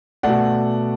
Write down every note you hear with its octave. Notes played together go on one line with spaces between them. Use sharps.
B2 A3 D5 F#5